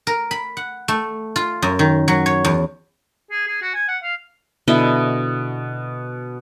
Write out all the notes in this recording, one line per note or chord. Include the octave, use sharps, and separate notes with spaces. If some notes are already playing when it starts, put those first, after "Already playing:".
A#4
B5
F#5
A3
F4
F#2
D#3
F#3
C#5
E2
G#4
G#4
F#4
G#5
F#5
F5
B2 D3 E4 D#5